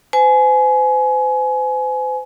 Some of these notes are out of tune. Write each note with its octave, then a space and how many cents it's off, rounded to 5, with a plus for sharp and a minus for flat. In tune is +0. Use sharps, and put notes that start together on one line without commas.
C5 -40 G#5 +25